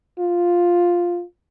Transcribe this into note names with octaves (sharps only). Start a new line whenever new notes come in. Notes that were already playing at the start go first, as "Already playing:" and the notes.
F4